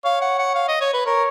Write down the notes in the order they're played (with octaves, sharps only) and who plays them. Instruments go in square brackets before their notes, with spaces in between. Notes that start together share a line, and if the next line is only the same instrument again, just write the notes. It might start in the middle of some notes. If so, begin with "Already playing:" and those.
[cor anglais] C#5 [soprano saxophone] F5
[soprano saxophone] F#5
F#5
F5
D#5
C#5
B4
[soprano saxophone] A#4 [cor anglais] C#5